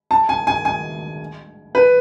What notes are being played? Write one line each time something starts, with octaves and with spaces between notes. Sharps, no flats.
A5
G#5
G#5
G#5
B4